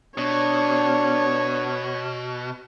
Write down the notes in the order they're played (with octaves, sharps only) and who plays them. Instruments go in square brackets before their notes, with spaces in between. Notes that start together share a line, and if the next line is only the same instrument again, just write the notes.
[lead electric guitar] B2 [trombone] D4 [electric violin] C#5